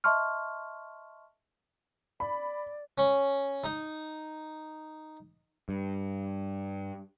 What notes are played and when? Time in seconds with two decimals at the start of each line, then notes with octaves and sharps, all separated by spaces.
0.04 D#5 E5 A5 C6 C#6 F6
2.20 D5 B5
2.98 C#4
3.64 D#4
5.69 G2